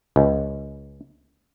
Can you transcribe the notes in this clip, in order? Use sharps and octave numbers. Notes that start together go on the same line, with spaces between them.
C#2